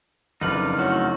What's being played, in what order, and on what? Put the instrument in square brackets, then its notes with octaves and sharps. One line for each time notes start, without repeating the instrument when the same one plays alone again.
[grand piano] F#1 F2 [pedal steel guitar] D#4 B4 D5 [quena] F6
[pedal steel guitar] A3 D#4 F#4 [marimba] E4 C#5